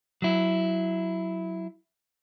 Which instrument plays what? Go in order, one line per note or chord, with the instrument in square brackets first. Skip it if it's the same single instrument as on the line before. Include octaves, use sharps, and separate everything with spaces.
[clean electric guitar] F#3 E4